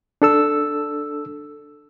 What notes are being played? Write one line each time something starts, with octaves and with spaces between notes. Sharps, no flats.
D4 A4 E6